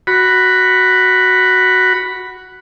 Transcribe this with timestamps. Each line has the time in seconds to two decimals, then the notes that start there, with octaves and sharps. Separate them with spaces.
0.07 F#4 B5